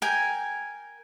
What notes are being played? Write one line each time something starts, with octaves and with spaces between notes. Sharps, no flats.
A#4 G5 G#5